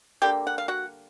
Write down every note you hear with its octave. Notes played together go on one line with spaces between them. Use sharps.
D3 G3 A#3 G4 G5
F#5
F5
F#4 F#5